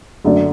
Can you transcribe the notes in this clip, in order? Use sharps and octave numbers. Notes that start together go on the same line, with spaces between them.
F#2 D3 A3 D4